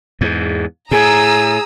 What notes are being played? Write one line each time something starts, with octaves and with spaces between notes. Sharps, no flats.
E2 G#2
A2 G#4 A#5 D#6 E6